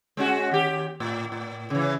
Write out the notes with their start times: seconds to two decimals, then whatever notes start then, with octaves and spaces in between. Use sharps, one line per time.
0.17 G#3 C#4 F#4
0.51 D#2 G4
1.00 A2
1.32 A2
1.70 C#3 E3